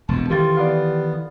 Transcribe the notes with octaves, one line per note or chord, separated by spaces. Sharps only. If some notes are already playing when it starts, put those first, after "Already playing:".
E1 F2 A5
D#3 E3 F4 G4 A4 A6
B3 F4 D5